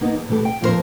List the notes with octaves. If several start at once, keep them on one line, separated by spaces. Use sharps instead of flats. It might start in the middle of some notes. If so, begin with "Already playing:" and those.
A#3 B3 D#4
E2
B2 E3 A3 G4 A4
G5
F2 A#2 F3 D4 A#4 C5